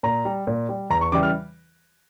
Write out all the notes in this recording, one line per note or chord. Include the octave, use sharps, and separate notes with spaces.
A#2 A#5
G3
A#2
G3
E2 A#5
C#6
C#3 E3 G3 D6
F6